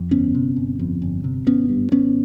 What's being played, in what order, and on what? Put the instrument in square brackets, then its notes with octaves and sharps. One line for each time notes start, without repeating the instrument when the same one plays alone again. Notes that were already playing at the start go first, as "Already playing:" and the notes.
Already playing: [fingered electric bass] F2
G1 B3 C#4
C3
G1
F2
G1
C3
G#1 B3 C#4
G2
G#1 B3 C#4